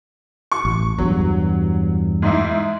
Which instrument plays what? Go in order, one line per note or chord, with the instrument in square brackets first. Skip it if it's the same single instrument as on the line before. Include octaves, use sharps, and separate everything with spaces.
[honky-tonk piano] C#6
[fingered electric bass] A1
[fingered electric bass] E2 G2 [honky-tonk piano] F#3
[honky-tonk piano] G#2 D#4 E4